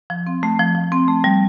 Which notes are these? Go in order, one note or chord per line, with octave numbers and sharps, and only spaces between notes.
F3
C4
A3
F3
F3
C4
A3
G3